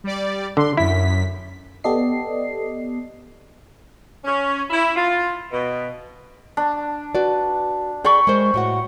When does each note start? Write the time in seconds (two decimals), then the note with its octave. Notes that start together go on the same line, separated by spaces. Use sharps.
0.04 G3 D5
0.57 D3 C6
0.77 F#2 E4 B6
1.84 B3 G4 A4 D5 D#5 C7
4.24 C#4
4.70 E4
4.96 F4
5.52 B2
6.57 D4
7.15 F#4 B4 D5
8.04 G#4 D5 G5 B5 C#6
8.27 G#3 A#4 C5
8.54 A2 F#4 F#5